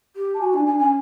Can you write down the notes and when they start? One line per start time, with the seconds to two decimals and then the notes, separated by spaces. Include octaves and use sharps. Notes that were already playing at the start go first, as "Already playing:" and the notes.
0.16 G4
0.35 A5
0.41 F#4 G#5
0.54 D4 G#5
0.66 D4 G#5
0.79 C#4 G#5